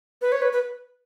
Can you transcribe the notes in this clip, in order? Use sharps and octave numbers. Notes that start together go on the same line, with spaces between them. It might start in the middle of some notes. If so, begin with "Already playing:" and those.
B4
C#5
B4
B4